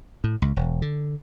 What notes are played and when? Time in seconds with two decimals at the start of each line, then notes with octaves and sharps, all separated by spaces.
0.24 A2
0.42 C#2
0.56 E1
0.82 D3